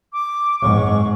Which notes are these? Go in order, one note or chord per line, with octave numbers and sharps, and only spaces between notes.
D6
G#2 C#6